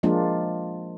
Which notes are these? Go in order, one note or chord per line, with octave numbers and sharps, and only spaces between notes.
F3 G#3 A#3 D4 F4